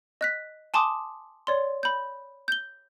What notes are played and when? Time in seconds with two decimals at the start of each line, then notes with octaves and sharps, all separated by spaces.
0.21 D#5 F#6 B6
0.74 G#5 A5 C6 D6 D#6
1.47 C#5 D5 C6
1.83 B5 G6
2.48 G6 G7